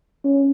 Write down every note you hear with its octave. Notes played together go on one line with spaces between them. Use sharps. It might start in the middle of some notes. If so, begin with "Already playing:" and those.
C#4